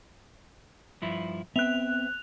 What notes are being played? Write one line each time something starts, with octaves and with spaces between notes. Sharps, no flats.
G2 F3 E4
B3 C4 E5 F#6 F7